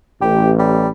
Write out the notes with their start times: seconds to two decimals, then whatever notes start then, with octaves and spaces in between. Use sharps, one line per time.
0.21 A1 G4
0.59 G3